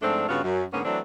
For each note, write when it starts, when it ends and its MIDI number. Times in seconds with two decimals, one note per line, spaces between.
0.02 0.27 44
0.02 0.27 53
0.02 0.27 57
0.02 0.27 60
0.02 0.27 62
0.29 0.43 43
0.29 0.43 49
0.29 0.43 59
0.29 0.43 65
0.29 0.43 66
0.29 0.43 73
0.44 0.65 42
0.73 0.81 44
0.73 0.81 50
0.73 0.81 58
0.73 0.81 59
0.73 0.81 61
0.85 1.00 52
0.85 1.00 54
0.85 1.00 57
0.85 1.00 60
0.85 1.00 62